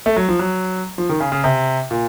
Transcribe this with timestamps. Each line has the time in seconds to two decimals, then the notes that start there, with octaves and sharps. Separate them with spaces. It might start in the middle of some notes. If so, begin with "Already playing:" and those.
0.06 A3
0.17 F#3
0.29 F3
0.39 F#3
0.98 F3
1.09 D#3
1.20 C#3
1.32 C#3
1.44 C3
1.91 A#2